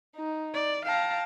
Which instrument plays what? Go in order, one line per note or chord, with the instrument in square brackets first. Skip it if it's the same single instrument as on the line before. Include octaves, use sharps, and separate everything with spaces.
[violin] D#4
[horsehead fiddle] D5
[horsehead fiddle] F5 A#5 [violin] G5 A5